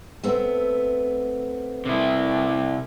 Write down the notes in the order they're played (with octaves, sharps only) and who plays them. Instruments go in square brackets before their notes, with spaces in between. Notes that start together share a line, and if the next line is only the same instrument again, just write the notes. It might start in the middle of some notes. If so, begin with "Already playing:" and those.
[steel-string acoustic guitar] A3 B3 C4
[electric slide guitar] C3 E4